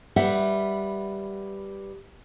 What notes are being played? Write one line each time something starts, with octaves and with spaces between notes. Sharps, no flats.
G3 B4 E5 F#5